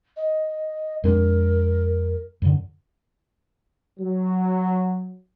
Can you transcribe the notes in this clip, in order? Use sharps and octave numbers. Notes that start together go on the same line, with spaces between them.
D#5
F2 G#3 D4 A#4
F#2 D3
F#3